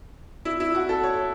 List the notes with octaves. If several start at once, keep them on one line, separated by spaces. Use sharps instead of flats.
E4
E4
F#4
A4
C#5